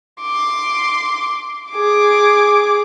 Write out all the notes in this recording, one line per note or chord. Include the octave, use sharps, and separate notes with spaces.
C6 D6
G#4 D6